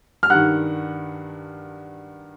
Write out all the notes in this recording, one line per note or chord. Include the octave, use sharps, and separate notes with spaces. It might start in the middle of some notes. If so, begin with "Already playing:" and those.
F6
G2 D#3 F#5 F#6